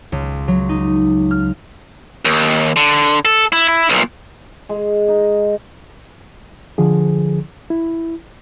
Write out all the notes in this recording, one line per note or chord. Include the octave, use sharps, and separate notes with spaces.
C#2
F#3
D#4
F6
D#2
D3
A4
E4
E4
B1 A#2
G#3
D#4
D3 F3 G#4
E4